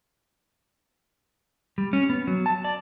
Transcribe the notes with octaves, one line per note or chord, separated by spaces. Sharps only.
G3
C#4
B3
F#3
A5
D5